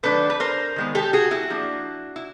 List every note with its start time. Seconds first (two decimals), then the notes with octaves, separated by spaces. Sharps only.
0.03 D#3 F#3 A3 D4 A4 B4
0.30 B4
0.40 A#4 C5
0.76 D#3 G#3 B3
0.95 G4 A4
1.13 F#4 G#4
1.31 E4 F#4
1.50 F3 A#3 D4
2.16 E4